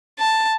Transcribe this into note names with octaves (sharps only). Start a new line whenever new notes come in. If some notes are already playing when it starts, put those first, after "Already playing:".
A5